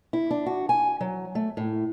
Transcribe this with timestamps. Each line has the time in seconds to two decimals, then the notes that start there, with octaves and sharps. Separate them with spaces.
0.13 E4
0.31 D4
0.46 F#4
0.69 G#5
1.01 F#3
1.35 A3
1.57 A2